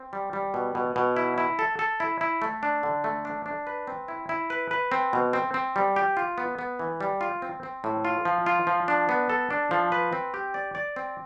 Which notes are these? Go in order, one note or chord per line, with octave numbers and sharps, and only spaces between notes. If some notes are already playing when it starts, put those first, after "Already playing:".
Already playing: C4
G3
G3
B2
B2
B2
E4
E4
A4
A4
E4
E4
A3
D4
D3
A3
D4
D4
B4
C4
E4
E4
B4
B4
C4
B2
C4
C4
G3
G4
F4
B3
B3
E3
G3
F4
C4
C4
A2
F4
F3
F4
F3
D4
B3
A4
D4
F3
B4
C4
G4
D5
D5
C4